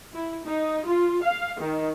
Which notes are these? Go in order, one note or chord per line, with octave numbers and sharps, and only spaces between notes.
E4
D#4
F4
F5
D#3